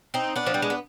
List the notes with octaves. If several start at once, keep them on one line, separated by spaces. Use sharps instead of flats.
C4 D#4
B3 D4
F3
G3
G#3
B3